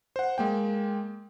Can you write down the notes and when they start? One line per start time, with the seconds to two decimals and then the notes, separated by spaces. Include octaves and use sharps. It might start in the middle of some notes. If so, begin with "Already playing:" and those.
0.16 C5 F#5
0.38 G#3 A#3 G5